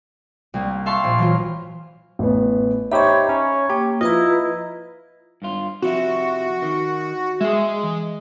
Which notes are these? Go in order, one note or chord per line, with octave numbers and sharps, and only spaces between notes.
C2 A#3
E5 F5 A5 C6 C#6
A#1
E3 F#3 F4
A1 B3
D#4 G4 C5 C#5 E5 A#5 B5
C#4 C#5
A#3 G4
F3 E4 F4 B4 D#5 A#5
G2 F4
C3 F3 E4 F#4
D#3
G#3 G#4 E5
E3